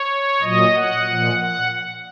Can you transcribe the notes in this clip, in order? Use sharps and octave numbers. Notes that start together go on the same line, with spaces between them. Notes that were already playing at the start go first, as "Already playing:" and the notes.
Already playing: C#5
A#2 F#3 D#5
F#5
A#2 F3
F#5